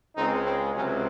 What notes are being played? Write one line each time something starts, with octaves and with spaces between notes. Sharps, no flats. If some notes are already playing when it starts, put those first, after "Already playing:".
C#2 C#3 G#3 C4 D#4
C4
C#2 C3 F#3 C4 C#4